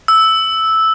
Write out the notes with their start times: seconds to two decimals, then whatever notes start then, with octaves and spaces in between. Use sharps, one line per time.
0.08 E6